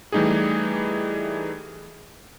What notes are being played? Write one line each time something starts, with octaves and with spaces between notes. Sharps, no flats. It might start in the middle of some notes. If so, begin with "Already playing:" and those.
E3 G3 A3 D#4 G4 G#4